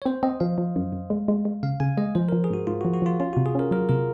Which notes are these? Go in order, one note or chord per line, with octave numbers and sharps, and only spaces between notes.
C#5
C4 C5
C4 D#5
F3 F5
F3
F#2
F#2
G#3
G#3
G#3
C#3 F5
C#3 G#5
G#3 D#5
F3 C5
F3 A#4
G#4
G#2 F#4
G#2 F4
F#4
F3
F#4
F3 F4
C#4 F4
C3 F#4
G#4
C#4 A#4
F#3 A#4
C3 A#4